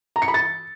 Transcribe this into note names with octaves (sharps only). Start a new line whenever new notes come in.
A#5
C#7
B5
A6